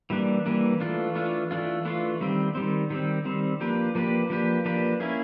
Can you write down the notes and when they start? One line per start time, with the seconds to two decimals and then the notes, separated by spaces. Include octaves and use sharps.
0.10 E3 G3 A#3 D4
0.46 E3 G3 A#3 D4
0.80 E3 A3 D4 F4
1.15 E3 A3 D4 F4
1.51 E3 A3 D4 F4
1.85 E3 A3 D4 F4
2.21 D#3 G3 C4
2.55 D#3 G3 C4
2.90 D#3 G3 C4
3.25 D#3 G3 C4
3.60 F3 A#3 D4 G4 B4
3.95 F3 A#3 D4 G4 B4
4.30 F3 A#3 D4 G4 B4
4.65 F3 A#3 D4 G4 B4
5.00 A#3 C#4 E4 G#4